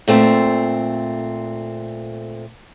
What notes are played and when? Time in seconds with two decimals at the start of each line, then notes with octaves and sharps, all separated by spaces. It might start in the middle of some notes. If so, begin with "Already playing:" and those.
0.08 A#2 A3 C4